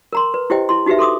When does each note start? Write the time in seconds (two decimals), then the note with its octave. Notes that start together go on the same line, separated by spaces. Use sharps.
0.13 A#4 A#5 C6
0.34 B4
0.50 E4 G4 C5 D#5 G5
0.69 E4 C6
0.86 D#4 F#4 G4 B4 E5
0.99 A4 C6 D6 D#6